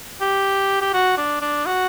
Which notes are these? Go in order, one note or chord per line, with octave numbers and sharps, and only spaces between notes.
G4
G4
F#4
D4
D4
F#4